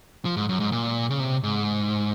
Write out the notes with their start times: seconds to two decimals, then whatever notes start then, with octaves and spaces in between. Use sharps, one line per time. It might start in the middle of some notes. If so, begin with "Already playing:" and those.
0.25 F3
0.37 G#2
0.49 F#2
0.60 G#2
0.72 A#2
1.10 C#3
1.20 C3
1.43 G#2